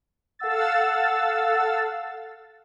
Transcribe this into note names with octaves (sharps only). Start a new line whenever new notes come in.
A4 F5 F#5 E6 A6